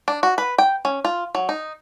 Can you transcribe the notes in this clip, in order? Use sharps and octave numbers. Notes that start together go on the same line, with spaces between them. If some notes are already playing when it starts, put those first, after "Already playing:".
D4
F#4
B4
G5
C#4
F4
F#3
D#4